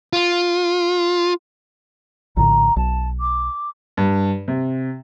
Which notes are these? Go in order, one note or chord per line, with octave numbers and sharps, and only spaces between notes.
F4
A#1 A2 D3 A#5
B1 A5
D6
G2
C3